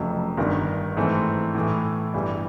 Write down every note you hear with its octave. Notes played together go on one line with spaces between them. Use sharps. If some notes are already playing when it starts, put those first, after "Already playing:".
Already playing: F1 F2 C#3 F#3 A3
G1 G2 D#3
G#2 E3 A3 C4
A2 E3 A3
G1 G2 E3 G3